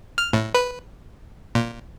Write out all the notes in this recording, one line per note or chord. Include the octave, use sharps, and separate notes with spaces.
F6
A2
B4
A#2